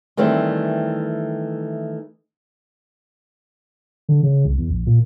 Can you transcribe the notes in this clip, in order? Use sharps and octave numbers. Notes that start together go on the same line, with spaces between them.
D#3 E3 G3 A3 C4
D3
C#3
C2
E2
A#1
A#2